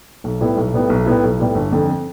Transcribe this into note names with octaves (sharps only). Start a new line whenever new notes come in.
B1
A2 G3 B3 E4
B1
A2 G3 B3 E4
B1
A2 G3 B3 E4
B1
A2 G3 B3 E4
G1
F2 D3